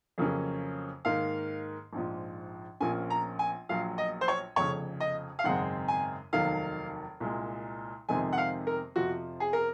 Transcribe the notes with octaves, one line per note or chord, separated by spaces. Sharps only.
F2 C#3 F#3 A#3 C#4
G#2 D#3 A#3 F5
A#1 G#2 F3
A#1 A#2 F3 A#3 C#4 G#5
A#5
G#5
A#1 A#2 F#3 F5
D#5
C5
C#5
F1 F2 C#3 C#5
D#5
F5
G#1 F#2 C#3 G#3 C4 F#5
G#5
F1 D#2 D#3 F#3 F5
C2 A#2 G#3
F2 C3 D#3 G#3 C4 G#5
F#5
F5
A#4
F2 C3 F3 F#4
G#4
A#4